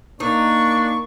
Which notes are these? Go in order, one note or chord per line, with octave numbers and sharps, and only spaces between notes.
A#3 D4 D#4 C#6